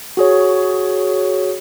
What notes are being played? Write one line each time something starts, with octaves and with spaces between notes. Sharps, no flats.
F#4 G#4 C#5